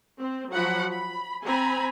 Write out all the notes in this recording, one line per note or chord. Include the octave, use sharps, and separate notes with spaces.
C4
F3 F#3 F#5 B5
B5
C4 G#5 A#5 B5